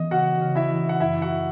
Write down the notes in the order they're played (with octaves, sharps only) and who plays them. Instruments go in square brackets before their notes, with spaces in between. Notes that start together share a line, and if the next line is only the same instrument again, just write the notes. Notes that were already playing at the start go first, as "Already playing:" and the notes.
Already playing: [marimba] E3 B3 [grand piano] D#5
[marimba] C#3 [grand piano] F#4 F#5
[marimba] C#3
[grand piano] E4 E5
[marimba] E3
[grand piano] F#5
[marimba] F#2 [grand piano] E4 E5
[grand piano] F#4 F#5